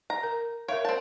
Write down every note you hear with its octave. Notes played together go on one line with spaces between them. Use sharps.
A#5
A#4
A#4 C#5 E5 F5
C4 A5